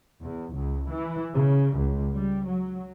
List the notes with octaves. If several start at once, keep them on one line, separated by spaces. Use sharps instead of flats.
E2
C#2
E3
C#3
C#2
G3
F#3